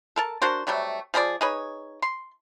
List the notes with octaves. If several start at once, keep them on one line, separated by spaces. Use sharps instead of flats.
A4 A#4 A5
D4 F#4 A#4 C5
C3 F#3 G3 A3
F3 G#4 A#4 D5
D#4 G#4 B4 C#5
C6